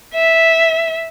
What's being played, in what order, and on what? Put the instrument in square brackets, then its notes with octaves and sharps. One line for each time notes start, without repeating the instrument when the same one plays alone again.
[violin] E5